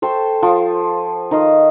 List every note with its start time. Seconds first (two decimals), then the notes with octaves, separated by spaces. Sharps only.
0.02 A4 C5 G5 C#6
0.42 F3
1.31 D#3 D#5 F5